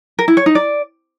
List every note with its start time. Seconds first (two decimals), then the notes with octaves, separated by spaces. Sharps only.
0.19 A#4
0.28 E4
0.37 C#5
0.46 D#4
0.55 D5